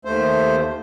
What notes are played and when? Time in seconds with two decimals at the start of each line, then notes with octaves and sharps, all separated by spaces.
0.05 D#2 A3 C5